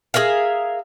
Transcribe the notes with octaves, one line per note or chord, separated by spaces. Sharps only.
G#4 A#4 E5 F5